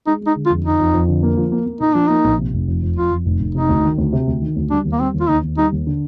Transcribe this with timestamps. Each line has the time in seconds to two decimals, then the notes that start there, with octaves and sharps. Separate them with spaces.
0.07 G#3 D#4
0.21 G#3
0.27 D#4
0.36 D3
0.46 F4
0.50 F2
0.64 F2 D#4
0.80 F2
0.94 F2
1.08 D3
1.23 A#3
1.37 F3
1.52 A#3
1.66 A#3
1.80 A#2 D#4
1.94 F3 D4
2.07 A#3 D#4
2.25 A#1
2.38 C3
2.53 F1
2.68 F2
2.82 F2
2.96 F2 F4
3.11 F2
3.26 F1
3.40 F1
3.55 C3 D#4
3.69 D2
3.84 D#3
3.98 D2
4.12 C3
4.27 D2
4.42 D#3
4.56 D2
4.70 G3 D4
4.85 D#2
4.92 A#3
5.00 G3 C4
5.14 D#2
5.20 F4
5.29 D#2 D#4
5.43 D#2
5.57 G3 D#4
5.72 D#2
5.87 D3